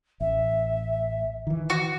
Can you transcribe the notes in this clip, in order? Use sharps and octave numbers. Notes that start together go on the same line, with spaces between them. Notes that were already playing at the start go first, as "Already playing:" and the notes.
A1 E5
D#3 E3
F#4